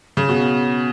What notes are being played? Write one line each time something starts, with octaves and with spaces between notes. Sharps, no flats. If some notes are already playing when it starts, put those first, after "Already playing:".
C#3
B2